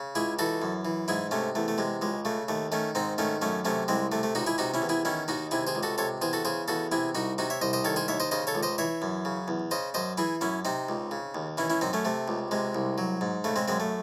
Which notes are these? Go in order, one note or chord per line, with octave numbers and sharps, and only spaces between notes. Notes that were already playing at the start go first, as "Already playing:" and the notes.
Already playing: C#3
C#2 E4 G#4
E3 F#4 A4
F#2
E3
G#2 E4 G#4
C3 A3 C#4
E2 A3
A3
C3 G#3
C#2 G#3
C#3 A3
D#2 A3
D#3 A3 C#4
G#2 C4 D#4
D#3 A3 C#4
F#2 A3 C#4
C3 A3 C#4
C2 G#3 C4
C3 A3
A3
C#2 D#4 F#4
E4 G#4
C3 D#4 F#4
C#4 E4
E2
E4 G#4
D#3 C#4 E4
D#2 D#4 F#4
C3 E4 G#4
G#4 C5
C#2
F#4 A4
C3 A4 C#5
E2 G#4 C5
F#4 A4
C#3 G#4 C5
E2 F#4 A4
C3 E4 G#4
C2 D#4 F#4
C3 D#4 F#4
C#5 E5
C2 C5 D#5
C5 D#5
D#3 A4 C#5
G#4 C5
D#2 C#5 E5
C5 D#5
C#3 C5 D#5
A4 C#5
C#2
C5 D#5
E3 C#5 E5
F#2
C#3
E2
C#3 C5 D#5
F#2 C5 D#5
E3 E4 G#4
F#2 C#4 E4
C3 C4 D#4
C#2
C#3
D#2
E3 C#4 E4
C#4 E4
F#2 C4 D#4
A3 C#4
C3 A3
C#2
C3 G#3
C2
F#3
G#2
C#3 A3
G#3 C4
F#2 G#3 C4
A3